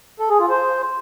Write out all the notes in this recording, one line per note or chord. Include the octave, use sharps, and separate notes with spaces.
A4
G#4
F4
C5